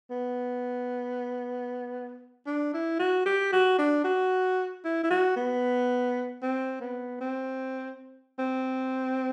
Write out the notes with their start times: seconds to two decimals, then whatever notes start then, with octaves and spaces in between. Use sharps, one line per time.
0.10 B3
2.46 D4
2.74 E4
2.99 F#4
3.26 G4
3.52 F#4
3.78 D4
4.04 F#4
4.84 E4
5.03 E4
5.10 F#4
5.36 B3
6.42 C4
6.81 B3
7.21 C4
8.39 C4